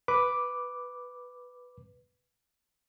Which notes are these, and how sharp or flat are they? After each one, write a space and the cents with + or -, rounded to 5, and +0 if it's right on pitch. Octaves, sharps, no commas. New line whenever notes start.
B4 +0 D6 +0